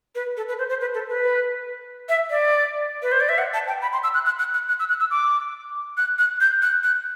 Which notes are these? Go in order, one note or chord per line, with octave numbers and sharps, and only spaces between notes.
B4
A4
B4
C5
C5
B4
A4
B4
E5
D5
B4
C5
D5
E5
F#5
A5
G5
B5
C6
E6
F#6
F#6
F#6
F#6
F#6
E6
F#6
E6
D6
F#6
F#6
G6
F#6
F#6